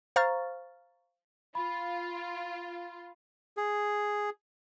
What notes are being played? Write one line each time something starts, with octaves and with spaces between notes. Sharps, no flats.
C5 F5 A#5 C#6 F6 A6
F4 B5
G#4